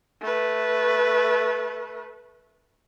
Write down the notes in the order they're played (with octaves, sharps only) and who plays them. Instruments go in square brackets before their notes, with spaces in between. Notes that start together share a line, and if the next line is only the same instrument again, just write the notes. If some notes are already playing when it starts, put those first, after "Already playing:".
[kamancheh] A3 B4